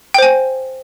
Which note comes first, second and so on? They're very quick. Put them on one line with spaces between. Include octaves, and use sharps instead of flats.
G5 C5 G#5